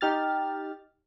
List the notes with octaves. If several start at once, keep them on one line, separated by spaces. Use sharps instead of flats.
D#4 G4 F6 A6